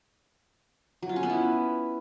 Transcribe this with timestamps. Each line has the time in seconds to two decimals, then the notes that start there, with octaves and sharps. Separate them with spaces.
1.03 F#3
1.09 F4
1.16 C#4
1.23 B3
1.30 E4